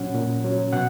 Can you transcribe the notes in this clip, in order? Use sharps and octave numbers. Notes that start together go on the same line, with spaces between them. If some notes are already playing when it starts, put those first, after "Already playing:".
Already playing: A#2 F#3 C#4 F#5
A#2
F#3 C#4
B2 F#5